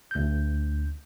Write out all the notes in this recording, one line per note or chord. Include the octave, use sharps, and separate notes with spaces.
D2 G6